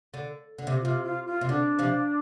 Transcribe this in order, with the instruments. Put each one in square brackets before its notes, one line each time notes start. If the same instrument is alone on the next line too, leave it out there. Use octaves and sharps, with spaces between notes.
[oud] D3
D3
C3
[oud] C3 [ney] F4
[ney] F4
F4
[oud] C3
[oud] D3 [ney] D4
[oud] C3 F3